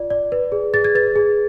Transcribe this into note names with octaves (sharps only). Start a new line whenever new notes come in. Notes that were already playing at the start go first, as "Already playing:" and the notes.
Already playing: F4 D5
D5
B4
G#4
G#4 A6
G#6
B4 A6
G#4